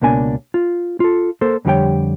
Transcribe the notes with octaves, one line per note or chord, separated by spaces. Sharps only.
C#2 B2 A#3 D4 G#5
F4
F4 A4
A#3 A4 C5
F2 D3 G3 G4 C#5 G5